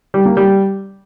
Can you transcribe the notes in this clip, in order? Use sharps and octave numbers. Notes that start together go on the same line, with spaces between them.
G3
A#3
G3